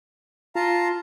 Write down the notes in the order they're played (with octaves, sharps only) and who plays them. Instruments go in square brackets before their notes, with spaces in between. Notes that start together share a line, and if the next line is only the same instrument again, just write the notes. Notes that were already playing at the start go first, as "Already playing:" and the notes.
[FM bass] F4 [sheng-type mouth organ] F5 A5 A#5